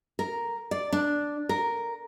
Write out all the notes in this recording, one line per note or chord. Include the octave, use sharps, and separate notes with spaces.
A#4
D5
D4
A#4